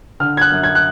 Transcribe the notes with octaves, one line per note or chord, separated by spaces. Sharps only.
D3 F6
G#6
F#6
F#2
G#6
F#6